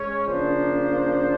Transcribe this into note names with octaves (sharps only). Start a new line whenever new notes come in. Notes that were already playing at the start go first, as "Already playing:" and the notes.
Already playing: G#3 C#4 C#5
C#3 F3 A#3 D4 C5